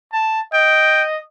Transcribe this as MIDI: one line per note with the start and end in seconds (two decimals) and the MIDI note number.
0.13 0.40 81
0.54 1.19 75
0.54 1.03 79